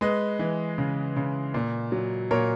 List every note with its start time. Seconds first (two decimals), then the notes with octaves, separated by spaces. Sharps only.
0.01 G#3 B4 D#5
0.39 E3
0.78 C#3
1.16 C#3
1.54 A#2
1.92 F#3
2.31 A#2 A#4 C#5